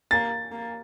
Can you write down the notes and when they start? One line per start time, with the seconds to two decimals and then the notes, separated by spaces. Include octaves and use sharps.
0.11 A#3 A6
0.51 A#3